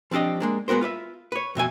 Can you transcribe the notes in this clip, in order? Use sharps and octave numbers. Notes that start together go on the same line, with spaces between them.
F3 C4 D4 G4 D#5
G#3 A#3 D4
G#3 B3 F#4 A#4 C5
F4 B4 D5 E5
B4 C#5
F2 B2 E5 G#5